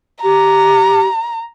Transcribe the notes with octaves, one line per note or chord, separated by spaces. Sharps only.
G4 A#5